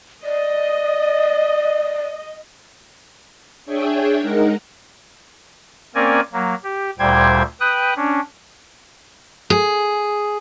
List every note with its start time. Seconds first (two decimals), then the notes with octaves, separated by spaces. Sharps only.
0.24 D5 D#5
3.65 D4 G#4 C#5 E5 G5 G#5
4.18 G#3 D#4 A#4 F#5
5.95 A#3 C4 C#4 A#4 D5 G#5
6.33 F#3 A#3
6.64 G4
6.99 D2 A#2 G3 C5 G5 G#6
7.60 B4 G5 D#6 F#6
7.96 C#4 D4
9.50 G#4